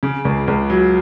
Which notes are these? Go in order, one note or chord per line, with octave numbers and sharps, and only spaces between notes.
C#3
C#2
C#2
F#3